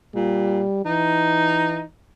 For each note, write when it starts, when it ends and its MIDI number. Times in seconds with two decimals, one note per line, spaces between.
0.15 0.61 46
0.15 0.81 55
0.86 1.82 52
0.86 1.84 63